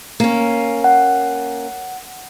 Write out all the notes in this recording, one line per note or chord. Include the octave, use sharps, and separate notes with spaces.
A#3 C#4
F#5